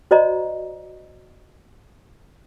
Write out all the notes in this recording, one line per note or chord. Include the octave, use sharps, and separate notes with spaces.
F#4 C5 D5 D#5 A#5